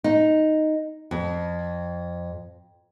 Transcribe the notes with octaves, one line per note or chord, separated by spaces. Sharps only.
D#4
F2